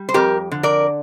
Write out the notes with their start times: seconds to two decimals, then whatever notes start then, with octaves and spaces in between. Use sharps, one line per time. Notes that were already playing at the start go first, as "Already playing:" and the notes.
Already playing: G3
0.09 C5
0.14 F2 G4 A#4
0.51 D3
0.63 A#4 D5